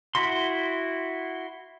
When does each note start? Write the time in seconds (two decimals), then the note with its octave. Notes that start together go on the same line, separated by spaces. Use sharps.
0.15 E4 F#4 C6